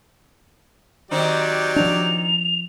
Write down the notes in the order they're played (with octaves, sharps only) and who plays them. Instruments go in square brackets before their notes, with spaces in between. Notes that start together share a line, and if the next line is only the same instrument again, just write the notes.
[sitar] D#3 C4 D#4 [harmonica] F#3 G4 D5
[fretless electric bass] F3 D4 [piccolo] F7